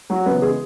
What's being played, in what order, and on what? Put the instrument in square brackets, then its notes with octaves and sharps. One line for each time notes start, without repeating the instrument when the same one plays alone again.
[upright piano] F#3 F#4
F#2 C#3 E3 B3 B4
G#3 G#4